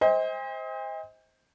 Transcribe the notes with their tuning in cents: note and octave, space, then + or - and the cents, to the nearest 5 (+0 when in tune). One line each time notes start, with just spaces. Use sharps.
C5 +0 D#5 +35 G5 +45